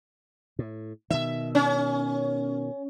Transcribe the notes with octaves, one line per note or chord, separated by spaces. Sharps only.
A2
B2 D#3 E5
C#4